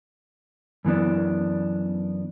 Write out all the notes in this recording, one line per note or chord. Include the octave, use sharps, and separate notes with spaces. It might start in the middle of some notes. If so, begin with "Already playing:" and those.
F#2 E3 B3 D4